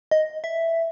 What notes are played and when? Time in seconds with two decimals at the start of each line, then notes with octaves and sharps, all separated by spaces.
0.11 D#5
0.44 E5